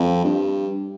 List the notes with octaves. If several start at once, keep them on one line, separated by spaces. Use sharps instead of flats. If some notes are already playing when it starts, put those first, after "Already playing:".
Already playing: F2
G2